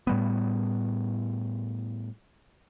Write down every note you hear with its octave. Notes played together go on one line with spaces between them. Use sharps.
A2 G3 B3